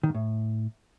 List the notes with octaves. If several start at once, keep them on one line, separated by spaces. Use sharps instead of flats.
D#3
G#2
A2